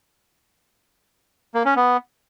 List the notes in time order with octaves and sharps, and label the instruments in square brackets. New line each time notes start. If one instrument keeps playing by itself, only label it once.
[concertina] A#3
C#4
B3